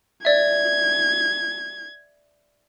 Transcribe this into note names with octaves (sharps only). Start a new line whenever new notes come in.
D5 E5 G#6